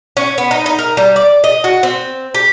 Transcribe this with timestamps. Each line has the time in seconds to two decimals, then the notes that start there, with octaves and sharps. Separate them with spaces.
0.17 C#4
0.38 B3
0.51 D#4
0.66 D#4
0.79 A#4
0.97 G3
1.16 D5
1.44 D#5
1.64 F#4
1.83 C4
2.35 G4